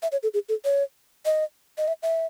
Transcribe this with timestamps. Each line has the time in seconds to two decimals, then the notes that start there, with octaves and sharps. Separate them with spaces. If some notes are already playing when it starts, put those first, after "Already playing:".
0.02 E5
0.12 C#5
0.23 A4
0.34 G#4
0.49 A4
0.65 C#5
1.25 D#5
1.78 D#5
1.88 E5
2.03 E5